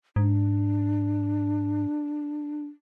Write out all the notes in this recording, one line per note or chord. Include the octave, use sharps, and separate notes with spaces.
G#2 D4